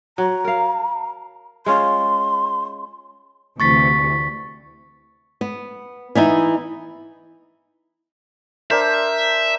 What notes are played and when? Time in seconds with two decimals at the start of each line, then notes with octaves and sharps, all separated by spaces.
0.18 F#3 A#5
0.45 A#4 F5
1.66 G#3 C#4 F4 C6
3.60 D2 C3 E3 C#6 A6 B6
5.41 B3
6.15 E3 B3 D#4 E4
8.71 D4 A#4 C5 E5